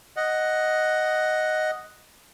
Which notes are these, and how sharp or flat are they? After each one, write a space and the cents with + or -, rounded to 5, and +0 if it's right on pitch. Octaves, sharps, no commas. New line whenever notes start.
D#5 +0 F#5 +0